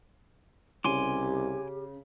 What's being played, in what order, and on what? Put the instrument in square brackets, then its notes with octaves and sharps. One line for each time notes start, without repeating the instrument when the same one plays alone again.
[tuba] C2 [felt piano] C#3 [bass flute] G4 [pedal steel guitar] G#5 C6 D6